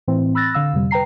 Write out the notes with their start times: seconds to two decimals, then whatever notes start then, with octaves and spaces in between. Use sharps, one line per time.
0.08 A2 E3 C4
0.35 B5 E6 F#6 A6 A#6
0.54 D3 F5 E6
0.73 F2 C3 G3
0.91 B4 G5 A#5 C7